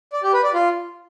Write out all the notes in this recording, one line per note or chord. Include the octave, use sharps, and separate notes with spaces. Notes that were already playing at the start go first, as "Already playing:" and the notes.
D5
G4
B4
D5
F4